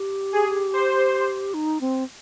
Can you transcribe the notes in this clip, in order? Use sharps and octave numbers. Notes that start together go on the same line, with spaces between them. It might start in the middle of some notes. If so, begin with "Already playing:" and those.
Already playing: G4
G#4
C5
D#4
C4